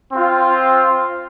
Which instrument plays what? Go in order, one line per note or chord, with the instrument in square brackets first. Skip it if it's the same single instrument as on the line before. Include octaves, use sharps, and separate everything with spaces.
[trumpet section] C4 F4